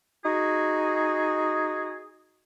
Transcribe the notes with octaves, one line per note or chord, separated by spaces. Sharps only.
D#4 F#4 G#4